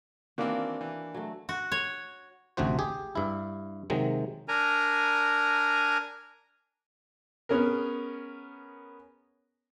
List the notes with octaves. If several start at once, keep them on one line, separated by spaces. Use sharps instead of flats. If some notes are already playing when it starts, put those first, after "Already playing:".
D#3 E3 A#3 C4 D4 F#4
E3
F#3 A3
F#4
C#5
A1 D2 C3 F#4 C5
G4 G#4
G2 E4
C3 D#3 F#3 G#3
D4 A#4 G#5 A#5
B3 C#4 G#4 A#4